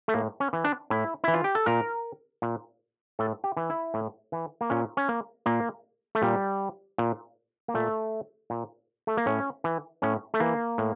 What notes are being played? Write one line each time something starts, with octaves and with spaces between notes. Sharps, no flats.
A3
A2 A#3
C#4
E3
D4
A2 E4
E3 E4
F4
G4
A4
A#2 A#4
A#2
A2 A4
G4
E3
E4
A2
E3
A#3
A#2 C#4
C#4
A#3
A#2 A#3
A3
A#2 G3
A#2
A#3
A#2 A3
A#2
A3
A#3
A2 C#4
E3
A2 C#4
A3
E3 A#3
A2